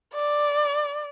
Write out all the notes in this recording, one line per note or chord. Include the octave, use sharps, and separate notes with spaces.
D5